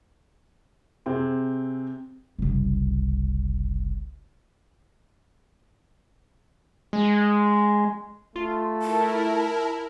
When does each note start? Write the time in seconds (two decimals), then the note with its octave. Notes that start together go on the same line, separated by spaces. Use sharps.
1.06 C3 C4 G#4
2.39 F#1 C2
6.93 G#3
8.36 A3 F4
8.82 E4 A#4 A5